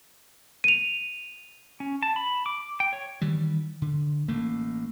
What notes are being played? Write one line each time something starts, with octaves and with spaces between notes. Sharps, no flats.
D#7 F7
C#4
A5
B5
D6
G5
C#5
D#3 E3 G3
D3
A1 A3 A#3